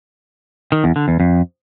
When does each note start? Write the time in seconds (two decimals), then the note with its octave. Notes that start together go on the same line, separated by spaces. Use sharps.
0.72 D#3
0.84 E2
0.96 D3
1.08 E2
1.20 F2